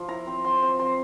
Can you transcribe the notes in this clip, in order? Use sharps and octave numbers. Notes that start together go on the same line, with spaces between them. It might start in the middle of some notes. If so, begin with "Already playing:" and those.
Already playing: F3
E4 A#5
C4
C4 C6
C4
C4 C6